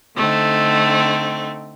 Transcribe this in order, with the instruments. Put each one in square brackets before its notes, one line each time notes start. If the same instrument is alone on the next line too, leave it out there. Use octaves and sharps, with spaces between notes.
[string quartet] D3 A3 C4 D#4